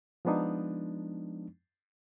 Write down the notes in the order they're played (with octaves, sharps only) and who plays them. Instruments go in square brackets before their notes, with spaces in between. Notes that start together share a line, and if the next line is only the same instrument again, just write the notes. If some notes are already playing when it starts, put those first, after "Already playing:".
[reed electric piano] F3 G#3 B3 D4 D#4